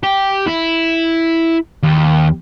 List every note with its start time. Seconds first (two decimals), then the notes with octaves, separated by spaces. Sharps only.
0.03 G4
0.48 E4
1.83 D#2